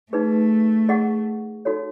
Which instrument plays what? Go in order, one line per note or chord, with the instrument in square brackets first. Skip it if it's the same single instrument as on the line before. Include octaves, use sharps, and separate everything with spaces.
[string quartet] A3 [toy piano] D#4 G#4 B4
[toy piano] G#4 D#5 F#5 C#6
D#4 F#4 A4 C#5